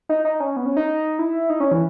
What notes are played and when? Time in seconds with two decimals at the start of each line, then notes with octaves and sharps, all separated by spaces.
0.09 D#4
0.25 D#4
0.40 C#4
0.56 B3
0.66 C#4
0.77 D#4
1.19 E4
1.50 D#4
1.60 C#4
1.71 E3